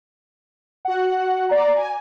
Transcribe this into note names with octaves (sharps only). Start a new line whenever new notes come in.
F#4 F#5
D5 A#5
G#5